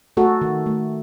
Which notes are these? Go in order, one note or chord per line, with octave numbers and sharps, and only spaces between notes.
A3 F#4 A4
D#3
A3